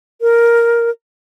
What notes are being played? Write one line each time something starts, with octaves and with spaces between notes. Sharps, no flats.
A#4